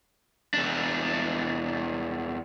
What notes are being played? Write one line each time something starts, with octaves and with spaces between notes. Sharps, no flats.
E2 D4